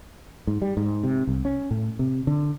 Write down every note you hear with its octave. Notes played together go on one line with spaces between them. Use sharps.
G#2
G3
G#2
C3
C2
C#4
A2
C3
D3